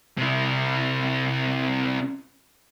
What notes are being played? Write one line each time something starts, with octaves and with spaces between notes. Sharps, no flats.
C3 E4